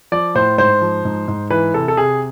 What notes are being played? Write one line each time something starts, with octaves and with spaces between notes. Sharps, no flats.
F3 D5
A2 C5
G#2 C5
F3
G#2
G#2
E3 B4
C3 A4
A4
C3 G#4